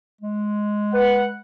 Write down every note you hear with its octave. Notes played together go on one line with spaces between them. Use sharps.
G#3
B4 F#5